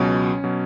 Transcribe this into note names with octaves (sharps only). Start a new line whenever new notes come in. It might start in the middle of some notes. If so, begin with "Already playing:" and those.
Already playing: C#2 B2 F#3 C#4
B2 F#3